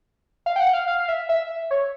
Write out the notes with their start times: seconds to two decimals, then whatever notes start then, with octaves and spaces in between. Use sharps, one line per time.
0.46 F5
0.56 G5
0.60 F#5
0.73 F5
0.88 F5
1.00 F5
1.08 E5
1.29 E5
1.71 C#5